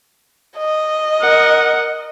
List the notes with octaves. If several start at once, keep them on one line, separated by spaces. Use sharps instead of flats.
D#5
A#4 F#5